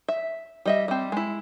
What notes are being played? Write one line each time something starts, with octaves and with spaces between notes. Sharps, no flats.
E5
G3 D#5 E5
G3 C4
G#3 E4